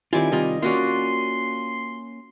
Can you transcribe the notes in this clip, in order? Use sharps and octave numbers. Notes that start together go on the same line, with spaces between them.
D#3 G3 C4 E4 F4 G#5 D6
C3 G3 F4 D#5
A#3 C#4 F4 F#4 D5 C6